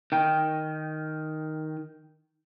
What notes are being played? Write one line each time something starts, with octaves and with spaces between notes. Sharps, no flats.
D#3 G5